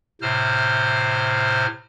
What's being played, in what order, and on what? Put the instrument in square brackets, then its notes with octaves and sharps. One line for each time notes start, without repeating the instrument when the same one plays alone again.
[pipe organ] A2 C3 C5 F6